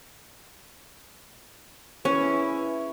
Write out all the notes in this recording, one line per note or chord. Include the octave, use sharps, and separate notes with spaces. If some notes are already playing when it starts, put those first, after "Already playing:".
C#4 E4 G#4 B4